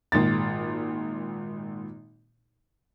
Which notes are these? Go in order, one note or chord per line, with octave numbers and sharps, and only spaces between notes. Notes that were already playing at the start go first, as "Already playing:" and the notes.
G#1 A#2 A6